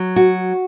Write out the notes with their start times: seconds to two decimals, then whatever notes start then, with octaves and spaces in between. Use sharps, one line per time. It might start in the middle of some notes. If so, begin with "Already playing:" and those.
Already playing: F#3
0.16 F#4